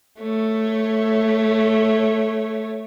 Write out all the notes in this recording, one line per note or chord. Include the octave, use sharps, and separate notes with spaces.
A3 C#5